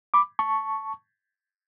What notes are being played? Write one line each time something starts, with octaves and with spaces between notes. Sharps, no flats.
B5 D6
A5 C#6